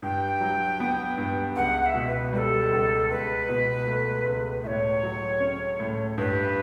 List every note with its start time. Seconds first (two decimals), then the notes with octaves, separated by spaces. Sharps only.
0.02 G2 G5
0.41 F#3
0.80 B3
1.18 G2
1.56 C#2 F#5
1.82 F#5
1.86 E5
1.95 B2
2.07 B4
2.33 G3 B4
2.37 A4
2.71 C#2
3.10 C#2 B4
3.49 B2
3.87 A3
4.25 C#2
4.64 A2 E5
4.67 C#5
5.03 F#3
5.40 C#4
5.80 A2
6.18 G2 B4